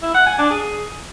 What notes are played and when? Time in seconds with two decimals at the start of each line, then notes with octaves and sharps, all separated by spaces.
0.02 E4
0.14 F#5
0.26 G#5
0.38 D4
0.50 G#4